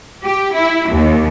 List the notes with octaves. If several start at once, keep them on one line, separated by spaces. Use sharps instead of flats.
G4
E4
D#2